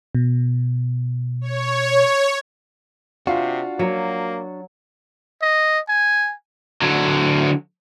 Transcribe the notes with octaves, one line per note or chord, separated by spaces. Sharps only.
B2
C#5
C3 D4 F4 F#4 F5
F#3 A#3
D#5
G#5
D3 F#3